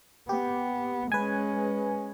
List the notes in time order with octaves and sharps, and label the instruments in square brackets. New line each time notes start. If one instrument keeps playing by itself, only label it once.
[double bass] B3 [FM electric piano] G4
[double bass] G#3 C#4 [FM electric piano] B4 G#5